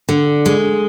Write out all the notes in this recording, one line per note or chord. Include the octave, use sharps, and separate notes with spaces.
D3
G#3